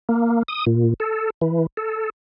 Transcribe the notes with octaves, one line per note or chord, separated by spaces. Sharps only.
A#3
D#6
A#2
A4
E3
A4